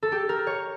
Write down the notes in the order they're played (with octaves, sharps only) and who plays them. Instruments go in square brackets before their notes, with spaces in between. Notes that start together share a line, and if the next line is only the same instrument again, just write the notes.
[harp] A4
G4
A#4
C#5